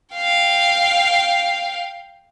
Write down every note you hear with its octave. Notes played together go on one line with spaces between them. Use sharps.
F5 G5